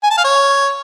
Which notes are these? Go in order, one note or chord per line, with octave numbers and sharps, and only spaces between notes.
G#5
A5
F5
C#5